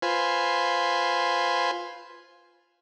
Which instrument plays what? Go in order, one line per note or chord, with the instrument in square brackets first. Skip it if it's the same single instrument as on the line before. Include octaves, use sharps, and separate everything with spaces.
[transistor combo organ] F4 B4 C5 G#5